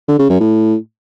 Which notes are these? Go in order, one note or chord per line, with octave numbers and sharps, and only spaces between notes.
D3
C#3
F#2
A2